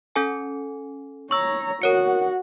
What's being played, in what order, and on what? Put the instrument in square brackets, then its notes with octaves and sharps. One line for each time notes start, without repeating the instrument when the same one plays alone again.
[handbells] C#4 A4 G#5
[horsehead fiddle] C#5 A#5 [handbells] C#6 E6
[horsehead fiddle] F#4 F#5 [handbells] A#4 C#5 C#7